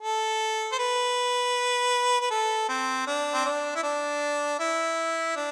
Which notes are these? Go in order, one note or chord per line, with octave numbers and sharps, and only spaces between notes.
A4
C5
B4
B4
A4
C4
D4
C4
D4
E4
D4
E4
D4